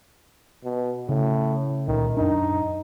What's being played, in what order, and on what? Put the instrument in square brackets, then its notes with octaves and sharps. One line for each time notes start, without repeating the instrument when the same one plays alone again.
[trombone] B2
[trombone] A2 [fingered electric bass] C#3
[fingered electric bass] C#2 A#2 [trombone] D#3
[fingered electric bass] F#2 D4 [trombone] D#4